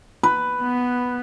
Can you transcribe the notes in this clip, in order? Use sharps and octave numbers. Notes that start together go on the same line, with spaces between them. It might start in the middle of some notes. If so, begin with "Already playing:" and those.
B4
B3